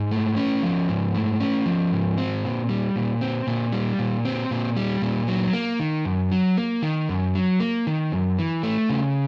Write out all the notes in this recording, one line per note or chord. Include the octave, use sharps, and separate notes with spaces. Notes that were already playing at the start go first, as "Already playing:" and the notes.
Already playing: G#2
A3
C#4
F3
G#2
A3
C#4
F3
G#2
C4
A#2
G3
A#2
C4
A#2
G3
A#2
C4
A#2
G3
A#2
F#3
A#3
D#3
F#2
F#3
A#3
D#3
F#2
F#3
A#3
D#3
F#2
E3
A3
C#3